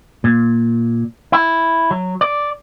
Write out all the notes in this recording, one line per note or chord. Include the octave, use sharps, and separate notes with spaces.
A#2
E4
F#3
D5